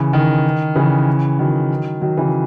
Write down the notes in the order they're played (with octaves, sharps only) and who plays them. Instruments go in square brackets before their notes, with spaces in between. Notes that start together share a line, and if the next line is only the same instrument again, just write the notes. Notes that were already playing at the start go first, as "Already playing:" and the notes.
Already playing: [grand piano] C#3 E3
D#3
C#3 E3
D#3 F#3
D#3 F#3
C#3 E3